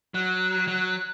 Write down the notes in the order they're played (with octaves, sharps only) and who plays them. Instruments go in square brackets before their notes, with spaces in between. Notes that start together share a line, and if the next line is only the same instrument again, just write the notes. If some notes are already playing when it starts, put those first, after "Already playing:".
[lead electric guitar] F#3 [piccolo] F#6
[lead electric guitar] F#3